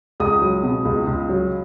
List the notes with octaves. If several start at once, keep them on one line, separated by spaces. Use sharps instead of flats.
C#2 D#6
F#3
B2
C#2
C#2
F#3